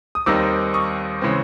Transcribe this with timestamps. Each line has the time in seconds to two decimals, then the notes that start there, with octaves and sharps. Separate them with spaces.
0.15 D#6
0.26 D#2 D#3 G3 C4 D#4 D6 E6
0.74 C#6 D#6
1.22 C#3 E3 G#3 C4